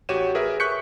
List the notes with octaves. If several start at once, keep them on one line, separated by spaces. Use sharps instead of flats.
A1 F#4 G4 C#5 D#7 E7
G#4 A#4 B4 E5
C#6 F#6 G6 B6 C#7